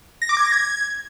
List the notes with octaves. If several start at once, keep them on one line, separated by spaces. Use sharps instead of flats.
A#6
D6
G#6
A#6
G#6